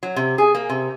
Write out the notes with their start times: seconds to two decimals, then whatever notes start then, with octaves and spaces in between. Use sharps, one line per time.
0.03 F#3
0.16 C3
0.38 G#4
0.55 A#3
0.69 C3